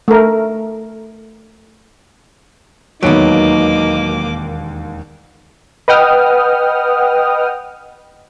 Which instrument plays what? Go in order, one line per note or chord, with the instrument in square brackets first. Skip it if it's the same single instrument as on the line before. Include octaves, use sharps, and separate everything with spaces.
[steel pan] A3 A#4
[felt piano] E1 D#2 D7 [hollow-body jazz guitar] F#3 B3 [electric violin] A#3 D6 [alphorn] D#4
[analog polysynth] B4 D#5 F#5 G5 D#6 F6